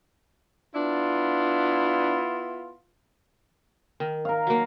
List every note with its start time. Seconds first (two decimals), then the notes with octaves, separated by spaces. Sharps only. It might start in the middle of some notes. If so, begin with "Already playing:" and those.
0.75 B3 D4 E4 F4
4.00 D#3
4.25 A#4 F5
4.47 F#3 A#3